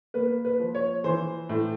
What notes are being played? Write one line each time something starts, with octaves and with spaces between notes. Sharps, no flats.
A#3 B4
B4
F3
C#5
E3 C5
A2